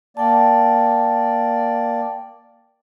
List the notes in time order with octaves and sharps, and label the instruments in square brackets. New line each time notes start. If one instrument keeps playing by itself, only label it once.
[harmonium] A#3 D5 [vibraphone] G5 A5